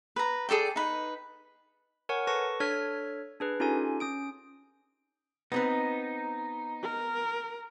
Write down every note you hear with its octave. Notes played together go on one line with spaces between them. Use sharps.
B4 A#5
G#4 A4 D5 G5
D#4 B4
A#4 C#5 F#5 G#5 C#6
A4 B4 A5 C#6 A#6
D4 A4 C#5 F6 G#6 B6
D4 G#4 B4
C#4 D#4 F4 G4 A4 G#5
C#4 D#6 D7
B3 C4 D#4 B4
A#4